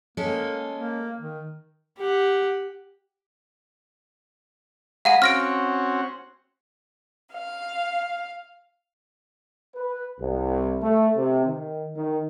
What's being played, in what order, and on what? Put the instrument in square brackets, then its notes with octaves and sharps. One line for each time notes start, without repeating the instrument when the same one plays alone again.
[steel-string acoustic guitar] G#3 C#4 A4 [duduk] A#3
[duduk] A#3
D#3
[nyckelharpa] G4 F#5
[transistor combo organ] G#3 A#5 B5 [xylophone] F5 F#5 D#7
[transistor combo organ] C4 C#4 F#4 [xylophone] F6 A#6 D7
[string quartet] F5
[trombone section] B4
C2
A3
C3
D#3
D#3